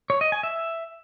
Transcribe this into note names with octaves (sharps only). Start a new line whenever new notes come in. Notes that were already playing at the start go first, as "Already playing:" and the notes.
C#5
D#5
G#5
E5